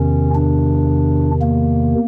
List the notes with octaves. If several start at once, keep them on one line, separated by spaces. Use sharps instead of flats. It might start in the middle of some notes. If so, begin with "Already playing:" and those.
Already playing: E2 C3 D#3 C#4
D4
A#3